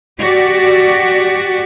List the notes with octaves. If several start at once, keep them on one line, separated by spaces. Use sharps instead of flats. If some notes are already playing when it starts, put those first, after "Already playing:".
F#4 G4 D5